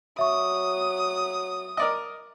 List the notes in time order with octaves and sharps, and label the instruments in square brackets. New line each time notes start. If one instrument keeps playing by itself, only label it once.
[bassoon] F#3 [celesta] E5 C#6 [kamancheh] D#6
[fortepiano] A#4 D5 D#5